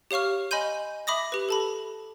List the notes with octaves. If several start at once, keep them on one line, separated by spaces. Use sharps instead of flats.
G4 C#5 F5 C#6 F6
D#5 G#5 B5 C6 G6 D#7
E5 B5 D6 D#6 A#6
G4 B4
A4 A5 B5